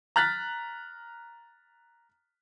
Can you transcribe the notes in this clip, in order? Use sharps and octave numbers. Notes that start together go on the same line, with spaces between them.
A#5 F6 F#6 A6 B6